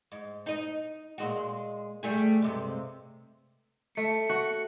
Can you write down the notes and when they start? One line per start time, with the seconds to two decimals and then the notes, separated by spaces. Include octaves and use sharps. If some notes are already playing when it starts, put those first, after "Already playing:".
0.12 G#2
0.46 D#4 D#5
1.18 A#2 G#3 F#4
2.03 G3 A3 G#4
2.42 G2 C3 G#3
3.97 A3 C#7
4.29 F#4